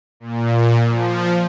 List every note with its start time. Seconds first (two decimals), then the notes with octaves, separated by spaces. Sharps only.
0.20 A#2
0.85 F3